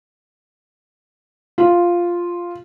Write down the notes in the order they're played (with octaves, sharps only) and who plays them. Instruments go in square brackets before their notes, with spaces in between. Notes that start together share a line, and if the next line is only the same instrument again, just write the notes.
[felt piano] F4